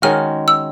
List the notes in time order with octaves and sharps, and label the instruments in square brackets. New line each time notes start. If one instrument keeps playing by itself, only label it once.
[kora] D#3 G#3 C#4 F#4 [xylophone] F6
[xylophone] E6